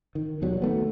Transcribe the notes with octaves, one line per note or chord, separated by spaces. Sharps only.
D#3
D#2 B2 F#3 G3
D#3 A3 B3